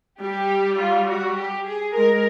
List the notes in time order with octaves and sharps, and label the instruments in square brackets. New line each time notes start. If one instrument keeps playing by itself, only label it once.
[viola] G3 [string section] G4
[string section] F4
F#4
G4
G#4
[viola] G#3 [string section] A#4